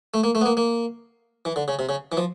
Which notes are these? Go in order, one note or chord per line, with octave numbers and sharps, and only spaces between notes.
A3
A#3
A3
B3
A#3
A#3
E3
D3
C#3
C3
C#3
E3
F3